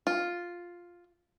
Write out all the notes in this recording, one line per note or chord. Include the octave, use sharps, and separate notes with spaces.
F4